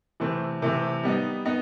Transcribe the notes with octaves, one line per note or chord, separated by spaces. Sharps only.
C3 E3 A3 C4
C3 E3 A3 C4
G3 B3 D#4
B3 D#4